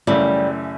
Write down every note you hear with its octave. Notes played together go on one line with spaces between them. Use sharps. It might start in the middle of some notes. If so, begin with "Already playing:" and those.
F#2 C#3 E3 G3 A3